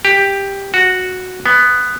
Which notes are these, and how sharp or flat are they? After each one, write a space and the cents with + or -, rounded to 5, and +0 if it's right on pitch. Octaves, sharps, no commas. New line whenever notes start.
G4 +10
F#4 -5
B3 +5